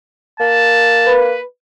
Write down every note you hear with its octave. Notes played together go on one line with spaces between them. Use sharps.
A#3 A5
B4